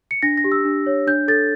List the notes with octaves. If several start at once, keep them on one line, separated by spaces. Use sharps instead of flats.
C#7
D4 A#6
A#6
G4
E6
D4
C#5
D4 G6
A4 A6